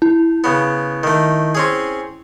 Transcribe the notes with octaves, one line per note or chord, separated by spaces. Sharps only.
E4
C#3 B3
D#3 A3
C4 C#4 G#4